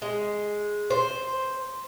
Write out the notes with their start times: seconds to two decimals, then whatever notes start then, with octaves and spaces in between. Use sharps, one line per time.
0.02 G#3
0.90 C5